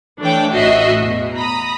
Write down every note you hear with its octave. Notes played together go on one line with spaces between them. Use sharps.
E3 A3 D4 C#5 G5 D6
A1 F#4 D#5 E5 C7
E2 B2
A#5 B5 D#6